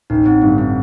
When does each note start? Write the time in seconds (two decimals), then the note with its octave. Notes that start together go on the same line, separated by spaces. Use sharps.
0.10 A1 D#4
0.26 C4
0.42 G2 D3 C4
0.58 C4